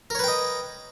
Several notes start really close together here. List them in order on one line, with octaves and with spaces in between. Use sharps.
A#4 C#5 B4 G5 D#5